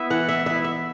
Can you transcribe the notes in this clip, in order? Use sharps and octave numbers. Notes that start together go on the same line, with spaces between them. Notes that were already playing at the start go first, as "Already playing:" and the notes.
Already playing: B3 E4 E5
E3 F#5
E5
B3 E4 E5
E5